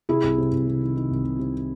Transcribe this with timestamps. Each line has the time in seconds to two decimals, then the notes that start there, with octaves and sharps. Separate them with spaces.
0.09 C3 E4 G#4
0.24 C2
0.38 C3
0.52 C2
0.67 C3
0.81 D#3
0.96 D#3
1.11 C2
1.24 C2
1.39 C3